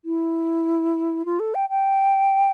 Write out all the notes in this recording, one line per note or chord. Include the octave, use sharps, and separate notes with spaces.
E4
F4
A4
G5
G5